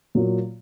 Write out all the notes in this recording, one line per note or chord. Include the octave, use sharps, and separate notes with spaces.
A#2 F#3 A#3 F4